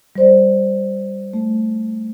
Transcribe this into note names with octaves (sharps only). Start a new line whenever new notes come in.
G3 C5 D5
A3